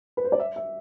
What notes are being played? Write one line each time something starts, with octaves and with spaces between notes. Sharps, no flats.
B4
C5
D5
E5
E5